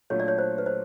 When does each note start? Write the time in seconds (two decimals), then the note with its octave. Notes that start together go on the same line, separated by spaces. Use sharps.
0.10 A#2 F#3 A3 D4 F4 C#5
0.20 D5
0.28 C#5
0.38 C5
0.58 B4
0.66 C5